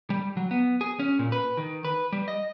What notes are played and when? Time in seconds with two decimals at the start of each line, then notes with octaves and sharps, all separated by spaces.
0.10 G3
0.37 F#3
0.51 B3
0.81 G#4
0.99 C#4
1.19 A#2
1.32 B4
1.57 D#3
1.85 B4
2.13 G3
2.28 D#5